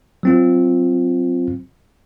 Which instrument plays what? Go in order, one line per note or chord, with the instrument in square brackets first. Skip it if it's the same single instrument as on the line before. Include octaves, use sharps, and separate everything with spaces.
[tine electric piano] F#3 C4 F4